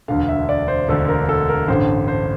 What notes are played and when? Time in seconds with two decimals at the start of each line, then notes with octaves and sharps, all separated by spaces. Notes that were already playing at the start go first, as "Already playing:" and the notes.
0.08 E1 D2 D3 F5
0.29 E5
0.49 D5
0.68 C5
0.88 E1 D2 D3 A4
1.08 A#4
1.29 A4
1.49 A#4
1.68 A1 G2 D3 C5
2.08 C5